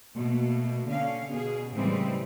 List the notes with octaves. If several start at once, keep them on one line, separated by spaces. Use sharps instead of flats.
B2 A3 A#3
D3 C#4 F5
B2 G#4
A2 C#3 E3 G3 G#3 C4